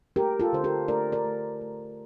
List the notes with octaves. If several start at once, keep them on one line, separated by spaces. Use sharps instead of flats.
A3 G4 A#4
F4 A4
D3 C5
G4 A#4
A3 A#4 D5
A#4 D5
A3
A3